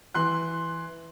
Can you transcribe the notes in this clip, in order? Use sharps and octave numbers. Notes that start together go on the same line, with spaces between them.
E3 C6 F#6